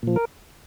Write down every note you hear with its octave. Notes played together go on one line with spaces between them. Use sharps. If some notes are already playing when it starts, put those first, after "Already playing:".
A#2 F3
A#4